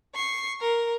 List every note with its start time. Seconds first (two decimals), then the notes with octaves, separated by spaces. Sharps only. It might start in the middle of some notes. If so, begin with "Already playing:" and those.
0.15 C#6 C7
0.60 A#4